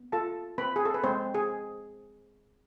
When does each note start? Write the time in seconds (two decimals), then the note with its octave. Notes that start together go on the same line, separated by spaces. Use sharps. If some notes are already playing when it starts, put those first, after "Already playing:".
Already playing: B3
0.12 F4 A4 A5
0.58 C4 B4 B5
0.76 G#4
0.85 A4
0.94 B4
1.03 G#3 C4 C5
1.35 G#4